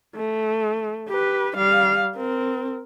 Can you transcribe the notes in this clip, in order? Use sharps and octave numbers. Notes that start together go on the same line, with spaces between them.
A3
G4 B4
G3 F5
C4 A#4